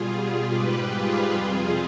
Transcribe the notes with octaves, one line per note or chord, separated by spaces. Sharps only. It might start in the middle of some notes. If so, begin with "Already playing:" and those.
Already playing: B2 G3 F4 G#4
G#2 G3 G4 B4
F4 G#4
F2 C3 G3